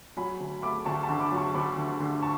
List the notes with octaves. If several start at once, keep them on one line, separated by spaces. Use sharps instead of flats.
F#3 G#5 B5
D2
A3 B5 D6
D2 A5 C#6
A5 C#6
D3
B5 D6
F#3
A5 C#6
D2 B5 D6
D3
D3
A5 C#6